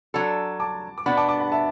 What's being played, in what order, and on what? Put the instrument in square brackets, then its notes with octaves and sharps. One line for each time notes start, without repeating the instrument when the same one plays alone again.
[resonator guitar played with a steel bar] F#3 D4 A4 [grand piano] F#5 B5
[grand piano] A5 D6
D6
[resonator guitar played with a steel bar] B2 B3 D4 [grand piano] F#5 B5
[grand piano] A5 D6
A5 D6
F#5 B5
E5 A5